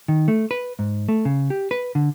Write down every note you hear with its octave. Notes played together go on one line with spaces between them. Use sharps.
D#3
A3
B4
G#2
A3
C#3
G4
B4
D3